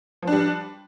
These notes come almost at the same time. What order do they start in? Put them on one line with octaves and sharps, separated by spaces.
F3 D4 G3